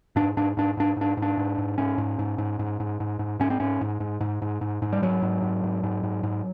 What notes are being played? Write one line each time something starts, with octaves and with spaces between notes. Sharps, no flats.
G#2 D4
G#2 D4
G#2 D4
G#2 D4
G#2 D4
G#2
D4
G#2
G#2
G#2 C#4
G#2
G#2
G#2
G#2
G#2
G#2
G#2
G#2 C#4
C4
G#2 C#4
G#2
G#2
G#2
G#2
G#2
G#2
G3
G#2 F#3
G#2
G#2
G#2
G#2
G#2
G#2